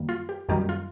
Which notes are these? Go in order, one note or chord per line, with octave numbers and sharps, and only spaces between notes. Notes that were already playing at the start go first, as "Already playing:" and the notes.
Already playing: F#2 D#3 G3 A#3
F4
G4
F#2 D#3 G3 A#3 G4
F4